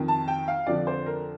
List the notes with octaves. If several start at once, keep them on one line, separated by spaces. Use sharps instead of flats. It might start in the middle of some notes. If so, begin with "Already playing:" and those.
Already playing: F2 D#3
A5
G5
F5
F2 D3 F3 D5
C5
A#4